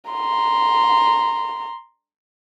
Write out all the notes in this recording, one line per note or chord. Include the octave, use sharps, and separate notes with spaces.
A#5 C6